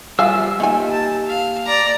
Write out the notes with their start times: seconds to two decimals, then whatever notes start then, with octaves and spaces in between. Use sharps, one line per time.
0.19 G3 F4 C5 E5 F5 G#5 E6
0.60 D#3 A#3 G4 G#5
0.91 A5
1.27 F5
1.66 D5 A#5